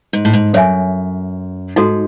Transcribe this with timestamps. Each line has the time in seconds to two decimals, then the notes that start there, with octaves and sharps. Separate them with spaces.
0.13 G#2
0.25 A2
0.33 G#2
0.53 F#2 A4 C#5 E5 G#5
1.76 G#2 D#4 F#4 A4